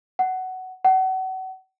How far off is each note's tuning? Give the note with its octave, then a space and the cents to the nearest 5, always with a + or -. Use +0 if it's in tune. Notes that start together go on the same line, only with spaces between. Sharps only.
F#5 +15
F#5 +35